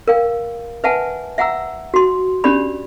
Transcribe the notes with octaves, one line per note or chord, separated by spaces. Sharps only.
A#4 F5 G5
B4 E5 F#5 G#5 A5
E5 F#5 G5 A#5 E6
F#4 C6
C#4 D4 G4 D5 B5